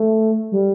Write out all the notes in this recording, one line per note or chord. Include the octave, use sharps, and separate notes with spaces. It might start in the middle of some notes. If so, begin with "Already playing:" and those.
Already playing: A3
G3